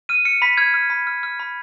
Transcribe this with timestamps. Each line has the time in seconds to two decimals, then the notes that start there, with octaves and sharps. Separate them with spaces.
0.09 F6 D#7
0.25 F6 C#7
0.42 B5 B6
0.57 F6 G#6
0.74 F6
0.90 B5
1.07 F6
1.23 F6
1.40 B5